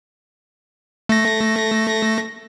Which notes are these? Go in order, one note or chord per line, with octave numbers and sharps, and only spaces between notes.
A3 A#6